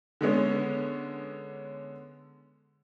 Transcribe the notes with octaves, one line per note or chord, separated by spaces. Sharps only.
D3 G#3 B3 C#4